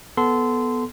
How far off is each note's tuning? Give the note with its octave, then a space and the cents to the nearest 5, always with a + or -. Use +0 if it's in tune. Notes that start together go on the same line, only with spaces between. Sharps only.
B3 -5 A4 -15 C6 -20